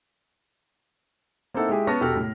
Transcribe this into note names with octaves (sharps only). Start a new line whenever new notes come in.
A#3 C4 D#4 E4 A4 F#5
G#3 E4 G4 G#4
B3 C#4 A5 C#6 F6 A#6
E1 F#4 G4 A4 F6
A2